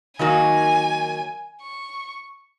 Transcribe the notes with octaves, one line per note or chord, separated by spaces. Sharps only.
D#3 F#3 A#3 D#4 F#4 G#5
C#6